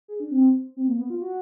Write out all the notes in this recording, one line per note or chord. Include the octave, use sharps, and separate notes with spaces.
G#4
D4
C4
C4
A#3
B3
F4
F#4